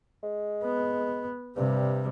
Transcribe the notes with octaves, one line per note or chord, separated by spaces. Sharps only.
G#3
B3
G2 C3 G3